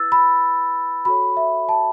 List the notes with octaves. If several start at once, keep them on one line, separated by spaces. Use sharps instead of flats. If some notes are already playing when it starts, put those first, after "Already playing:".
Already playing: E4 B4 E6 A6
B5
F#4 A4 C#5 B5
E5
A5